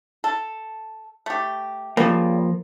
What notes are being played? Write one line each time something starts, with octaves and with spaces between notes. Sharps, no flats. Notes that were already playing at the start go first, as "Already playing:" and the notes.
A4
A3 G4
C#3 F3 G3 A#3